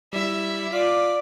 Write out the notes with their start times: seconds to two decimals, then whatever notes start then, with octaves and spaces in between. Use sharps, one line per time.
0.13 G3 E4 E5
0.72 F4 D5 D6 B6